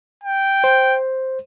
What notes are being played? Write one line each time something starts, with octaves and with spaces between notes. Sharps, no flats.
G5
C5